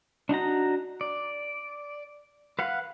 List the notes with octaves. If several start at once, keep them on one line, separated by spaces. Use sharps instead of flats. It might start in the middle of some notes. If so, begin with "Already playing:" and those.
D4 D#4 F#4 A#5
D5
B4 F5 F#5